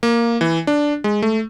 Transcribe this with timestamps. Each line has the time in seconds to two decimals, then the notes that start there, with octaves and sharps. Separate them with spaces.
0.03 A#3
0.41 E3
0.67 D4
1.04 G#3
1.22 A3